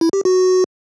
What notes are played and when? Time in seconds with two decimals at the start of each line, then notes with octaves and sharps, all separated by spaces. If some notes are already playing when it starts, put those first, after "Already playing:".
0.01 E4
0.13 G4
0.25 F#4